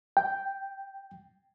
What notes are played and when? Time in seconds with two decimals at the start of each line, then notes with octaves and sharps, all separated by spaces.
0.17 G5